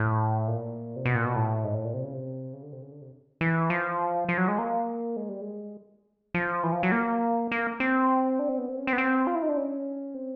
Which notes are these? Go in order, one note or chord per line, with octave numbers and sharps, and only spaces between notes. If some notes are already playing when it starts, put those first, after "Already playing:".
Already playing: A2
A#2
C3
B2
A#2
B2
A2
G#2
A2
A#2
C3
C#3
C3
C#3
D3
C3
C#3
D3
C3
E3
F3
F3
F#3
G#3
A#3
G#3
G3
G#3
F3
E3
F3
F#3
A#3
A#3
C4
D4
C4
B3
C4
C#4
C4
B3
C4
F4
E4
D#4
D4
C#4
C4